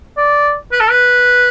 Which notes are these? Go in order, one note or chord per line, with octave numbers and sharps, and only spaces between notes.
D5
B4
A4
B4